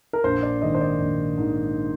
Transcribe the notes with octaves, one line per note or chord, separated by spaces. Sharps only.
A#4
A#1 C5
D5
G#2 D#3 D#5
C5
D5
A#1
G#2 D#3